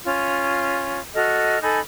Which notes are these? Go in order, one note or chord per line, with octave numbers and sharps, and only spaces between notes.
C#4 F4
F#4 A4 D#5 F6
D#4 A4 G#5 B5